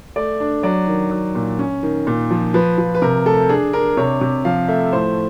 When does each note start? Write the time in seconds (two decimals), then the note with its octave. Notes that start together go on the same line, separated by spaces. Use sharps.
0.16 A3 D5
0.40 D4
0.63 F#3 D5
0.88 D#3
1.11 F#3
1.35 A#2
1.59 C#4
1.83 D#3
2.07 A#2
2.31 F3
2.54 F3 B4
2.78 F3
2.95 B4
3.02 C3 A#4
3.25 A3 A4
3.49 D4 G#4
3.73 D4 A#4
3.97 C3 C#5
4.21 C3
4.45 F3 F5
4.68 A3 E5
4.93 A2 C5